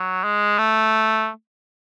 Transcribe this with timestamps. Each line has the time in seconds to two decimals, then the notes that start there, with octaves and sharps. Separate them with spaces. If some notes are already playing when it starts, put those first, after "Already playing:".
Already playing: F#3
0.24 G#3
0.58 A3